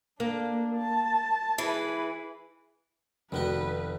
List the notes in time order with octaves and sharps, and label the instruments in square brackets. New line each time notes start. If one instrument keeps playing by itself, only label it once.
[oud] A#3 [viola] D4
[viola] A5
[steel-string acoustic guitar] E3 [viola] G#4 B4
[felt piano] F1 [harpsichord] D#3 B3 F#4 [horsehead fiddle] B4